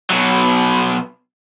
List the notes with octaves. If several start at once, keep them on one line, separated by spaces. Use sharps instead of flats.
B2 F#3